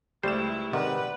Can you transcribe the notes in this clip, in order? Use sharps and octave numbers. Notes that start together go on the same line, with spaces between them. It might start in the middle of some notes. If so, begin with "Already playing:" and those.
C#2 G3 A3 E4 G4 C5 E7
G#2 C3 D#3 B4 D5 F#5